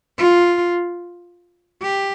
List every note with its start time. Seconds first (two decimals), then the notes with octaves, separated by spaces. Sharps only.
0.18 F4
1.83 G4